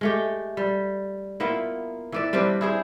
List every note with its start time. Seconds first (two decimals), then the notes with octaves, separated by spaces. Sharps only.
0.01 G#3 A3 G4
0.57 G3
1.40 A#3 B3 E4 F4
2.12 E3 D5 E5
2.33 G3 C4 D4 B4
2.61 E4 G#4 C5